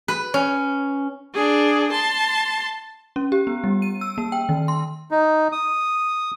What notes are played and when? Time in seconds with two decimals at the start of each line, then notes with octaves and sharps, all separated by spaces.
0.08 B4
0.34 C#4
1.34 D4 G#4
1.92 A5 C6
3.16 C#4
3.32 G4
3.47 B3
3.64 G3
3.82 D#7
4.01 E6
4.18 A#3
4.32 G5
4.49 D#3
4.68 C6
5.11 D#4
5.52 D#6